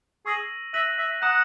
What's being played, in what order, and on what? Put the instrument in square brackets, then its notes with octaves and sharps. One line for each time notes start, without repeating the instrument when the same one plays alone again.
[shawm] G#4 [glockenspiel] C#6 E6 A#6 D#7 F#7
[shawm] E5 [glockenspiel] F#6 A#6 D#7 F#7
[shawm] E5
[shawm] F#5 [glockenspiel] A#5 D#6 F#6 A#6 E7